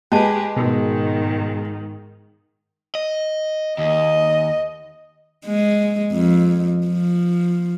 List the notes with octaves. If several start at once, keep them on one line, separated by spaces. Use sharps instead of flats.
G#3 G4 G#4 B4 G5 A5
G#2 B2 D#3
D#5
D#2 D#5
G#3
F2
F3